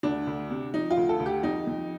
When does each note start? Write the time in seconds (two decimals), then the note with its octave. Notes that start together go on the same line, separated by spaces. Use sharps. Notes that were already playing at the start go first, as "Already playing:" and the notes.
0.03 D2 D4
0.27 D2
0.50 C3
0.73 F3 D#4
0.91 F4
0.97 D2
1.09 A4
1.20 D2
1.26 G4
1.43 F2 D#4
1.67 F2